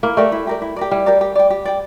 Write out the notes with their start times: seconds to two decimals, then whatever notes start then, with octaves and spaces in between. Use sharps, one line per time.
0.03 A#3 E4
0.17 A3 G4 A#4 D5
0.32 E4
0.47 G4 A#4 D5
0.62 E4
0.76 G4 A#4 D5
0.91 G3 E4
1.06 G4 A#4 D5
1.21 G4
1.35 D5 G5
1.50 G4
1.65 D5 G5